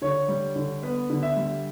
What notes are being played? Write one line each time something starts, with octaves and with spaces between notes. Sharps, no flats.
D3 C#5
G3
D3
B3 B4
D3
E5
G3